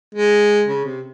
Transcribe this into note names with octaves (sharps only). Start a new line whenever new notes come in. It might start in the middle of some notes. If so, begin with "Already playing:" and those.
G#3
C#3
C3